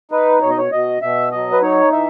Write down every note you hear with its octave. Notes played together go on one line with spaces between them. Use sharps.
D#4 B4
B2 C#5
D#5
C#5
B2 D#5
B2 E5
F#3 D#5
B4
D#4 C#5
E3 E5